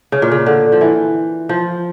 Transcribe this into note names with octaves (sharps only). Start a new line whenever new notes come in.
C#3
A#2
C#3
D3
F3
E3
F3